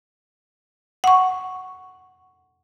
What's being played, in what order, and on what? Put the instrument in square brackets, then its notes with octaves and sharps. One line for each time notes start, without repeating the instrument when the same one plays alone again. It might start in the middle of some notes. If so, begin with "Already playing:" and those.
[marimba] F#5 C#6